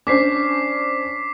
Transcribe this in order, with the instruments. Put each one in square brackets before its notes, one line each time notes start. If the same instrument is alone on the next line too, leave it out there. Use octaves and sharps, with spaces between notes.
[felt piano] C#4 D4 C5 [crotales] D6 B6 C7